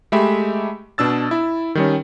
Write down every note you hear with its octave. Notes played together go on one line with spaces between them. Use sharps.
G#3 A3 G4 E5 B5
B2 D4 E6 A6
E4
D#3 G3 C#4